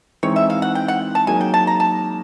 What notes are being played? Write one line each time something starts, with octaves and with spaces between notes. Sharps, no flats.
E3 G#3 C4 D#4 C#5
E5
F5
F#5
G5
F#5
A5
F#3 A#3 D#4 G#4 G#5
G5
A5
A#5
A5